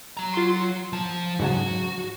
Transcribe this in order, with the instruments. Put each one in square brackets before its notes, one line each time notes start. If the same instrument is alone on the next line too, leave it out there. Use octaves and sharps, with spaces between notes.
[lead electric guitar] F#3 A#5
[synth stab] F4 C6
[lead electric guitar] F3 A5
[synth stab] G#2 C#3 F#3 [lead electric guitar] F#4